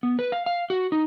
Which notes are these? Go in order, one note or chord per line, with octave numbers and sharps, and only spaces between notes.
B3
B4
F5
F5
F#4
D#4